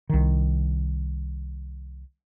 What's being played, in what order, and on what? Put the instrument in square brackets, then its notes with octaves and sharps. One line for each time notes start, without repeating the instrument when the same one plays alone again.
[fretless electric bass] C2 D#3